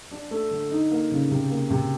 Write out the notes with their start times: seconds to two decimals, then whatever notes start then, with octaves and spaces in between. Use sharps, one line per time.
0.11 D4
0.31 A3
0.51 D3
0.71 D#4
0.91 A#3
1.12 C#3
1.31 C3
1.50 A#3
1.70 C3